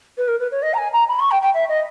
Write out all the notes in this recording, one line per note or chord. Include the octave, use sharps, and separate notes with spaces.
B4
A#4
B4
C#5
D#5
A#5
G#5
A#5
B5
C#6
G5
G5
E5
D#5